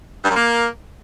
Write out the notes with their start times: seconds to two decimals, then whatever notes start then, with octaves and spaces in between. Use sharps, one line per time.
0.25 G2
0.30 F#2
0.35 A#3